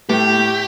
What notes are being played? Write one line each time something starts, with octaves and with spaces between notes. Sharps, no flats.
A2 A3 G4